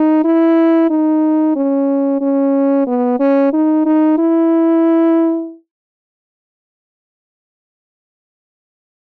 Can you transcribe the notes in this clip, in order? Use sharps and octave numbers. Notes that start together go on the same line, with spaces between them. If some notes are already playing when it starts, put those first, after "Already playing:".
Already playing: D#4
E4
D#4
C#4
C#4
B3
C#4
D#4
D#4
E4